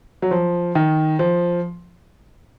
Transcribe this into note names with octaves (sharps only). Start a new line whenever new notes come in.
F#3
F3
D#3
F3